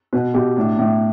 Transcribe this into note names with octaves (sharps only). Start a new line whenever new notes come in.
B2 B4
B2 G4
A2 D4
A2